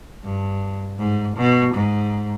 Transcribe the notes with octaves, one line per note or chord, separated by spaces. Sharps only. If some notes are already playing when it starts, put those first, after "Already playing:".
G2
G#2
B2
G#2